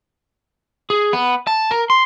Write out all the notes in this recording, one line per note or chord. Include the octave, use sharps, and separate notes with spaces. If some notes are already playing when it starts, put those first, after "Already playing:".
G#4
B3
A5
A#4
C6